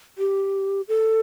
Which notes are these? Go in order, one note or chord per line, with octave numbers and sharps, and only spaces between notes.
G4
A4